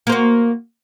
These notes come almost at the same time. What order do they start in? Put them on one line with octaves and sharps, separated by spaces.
A#3 C5 F#4